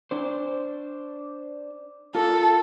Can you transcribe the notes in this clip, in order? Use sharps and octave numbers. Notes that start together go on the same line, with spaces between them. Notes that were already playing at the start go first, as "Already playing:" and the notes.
D4 C5
F4 A4 A#4